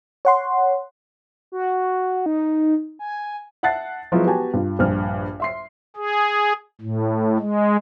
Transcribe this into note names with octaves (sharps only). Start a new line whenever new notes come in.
C#5 F#5 C6
F#4
D#4
G#5
E5 F#5 A5 F#6 A6 C7
F3 F#3 G#3 B3 E4 F4
B3 F#4 G4 G#5 A5
G2 F4
A#1 G2 F6
E5 C6 C7
G#4
A2
G#3